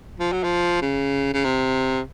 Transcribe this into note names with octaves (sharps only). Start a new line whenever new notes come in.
F3
F#3
F3
C#3
C#3
C3